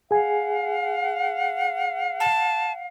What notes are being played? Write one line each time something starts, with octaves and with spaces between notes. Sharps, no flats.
G#4 F5 F#5 G#5
A5